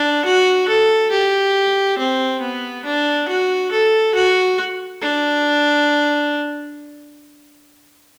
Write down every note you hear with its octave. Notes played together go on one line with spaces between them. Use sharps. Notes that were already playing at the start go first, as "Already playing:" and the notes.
Already playing: D4
F#4
A4
G4
C4
B3
D4
F#4
A4
F#4
D4